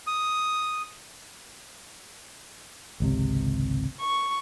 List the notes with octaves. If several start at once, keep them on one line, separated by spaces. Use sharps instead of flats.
D#6
G#1 C#2 C3
C#6